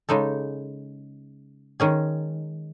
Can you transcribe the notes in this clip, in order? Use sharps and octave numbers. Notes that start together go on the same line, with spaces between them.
C#3 G#3 D#4 A4
D#3 G#3 C#4 G#4